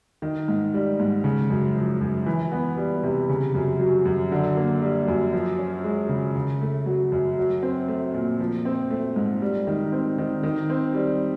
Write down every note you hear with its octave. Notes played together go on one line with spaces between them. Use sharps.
D#3
G#2
G3
G#2
C#3
F#2
F3
F#2
E3
B3
G3
C3
C#3
F#2
F#3
F#2
D3
A#3
G3
F#2
F3
C#4
G#3
C#3
C#3
A3
F#3
F#2
F#3
C4
A3
A#2
F3
C4
A3
G#2
G3
D#3
C4
D#3
D#3
C4
G3